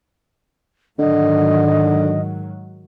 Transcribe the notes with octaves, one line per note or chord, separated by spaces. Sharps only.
G#2 D3 D#3 F#3 D#5